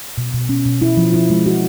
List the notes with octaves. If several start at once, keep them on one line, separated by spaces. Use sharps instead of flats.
B2
B2
C#4
B2
E4
F3
E4
G#3
F#4